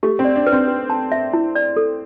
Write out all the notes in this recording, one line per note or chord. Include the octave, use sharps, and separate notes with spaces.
A3 G4
C4
D5
D4
B4
C4
B4
A5
E5
E4
D5
A4